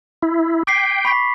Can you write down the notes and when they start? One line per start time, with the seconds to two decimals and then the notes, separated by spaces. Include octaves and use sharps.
0.23 E4
0.67 G5 D6 B6 C7
1.05 B5 C#6 B6